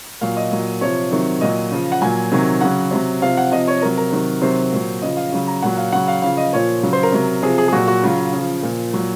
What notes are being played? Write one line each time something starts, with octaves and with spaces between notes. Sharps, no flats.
A#2 F#3 F5
D#5
A#2 F#3
C3 F3 C#5
C3 D#3 F#3
A#2 F#3 D#5
C#3 F3
F#5
A#2 F#3 G#5
C3 D#3 F#3
C#3 F#3 F#5
C3 F#3
C3 F3 F5
F#5
C3 F3 D#5
C#5
C3 F#3 A#4
A#4
C3 D#3 F#3
C3 D#3 F#3 C5
A#2 F#3
C#3 F3 D#5
F5
C#3 F#3
A#5
A#2 F#3 F#5
F5
C#3 F#3 F#5
F5
C#3 F3 F5
D#5
A#2 F3 C#5
C#3 F#3
C5
A#4
C3 F#3
C3 F3 G#4
G#4
G#4
A#2 F#3 F#4
F#4
C#3 F#3 F4
C#3
F3
A#2 F3
A#2 F#3